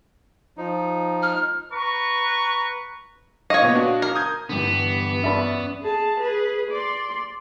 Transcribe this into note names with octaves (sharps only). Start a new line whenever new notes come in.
F3 D#4
F6
B4 A#5 C#6
C#5 D#5 F5 C#6 D#6
A#2 B3
D4 F#4 F5
A#4
D#6 G6 G#6
G2 D3 E3 G3 B3
C#4 D5 E5 B5
G#4 A5
G#4 B4
D5 C6